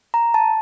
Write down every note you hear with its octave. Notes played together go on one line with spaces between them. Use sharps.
A#5
A5